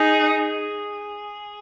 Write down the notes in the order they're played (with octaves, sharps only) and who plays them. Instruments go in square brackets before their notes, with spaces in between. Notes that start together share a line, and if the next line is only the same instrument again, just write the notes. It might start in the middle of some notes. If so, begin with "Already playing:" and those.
Already playing: [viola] D#4 [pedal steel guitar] G#4